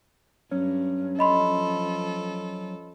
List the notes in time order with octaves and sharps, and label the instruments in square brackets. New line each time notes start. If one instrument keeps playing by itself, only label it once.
[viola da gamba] G2 [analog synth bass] F#3 [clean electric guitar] C#4
[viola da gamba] F3 A4 [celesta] D#5 B5 C6